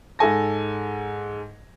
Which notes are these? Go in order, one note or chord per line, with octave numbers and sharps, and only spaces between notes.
G#2 A4 G#5 A#6